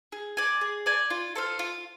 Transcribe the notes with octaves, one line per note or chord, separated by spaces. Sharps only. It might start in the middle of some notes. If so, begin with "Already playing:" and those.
G#4
D5 G#5
G#4
D5 G#5
F4
A4 C5 F5
F4